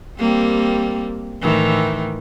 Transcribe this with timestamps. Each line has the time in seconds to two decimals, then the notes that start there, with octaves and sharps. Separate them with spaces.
0.18 G3 A#3 C4
1.41 A2 D#3 E3